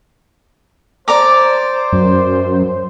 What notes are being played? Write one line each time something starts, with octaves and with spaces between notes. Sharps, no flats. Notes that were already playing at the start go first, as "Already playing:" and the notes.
C5 D5 A#5 D6
F#2